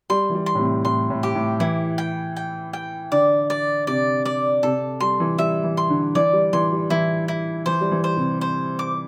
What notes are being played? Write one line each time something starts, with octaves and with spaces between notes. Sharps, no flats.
G3 C6
E3
G3
C6
A2
C3
A2 C6
A2
G4
A2
E3 E4
G5
G5
G5
D3 D5
D5
C3 D5
D5
C3 A4
G3 C6
E3
G3 E5
E3
C6
D3
E3 D5
G3
E3 C6
G3
E3 E4
E4
E3 C5
G3
E3
C5
C3
C5
D6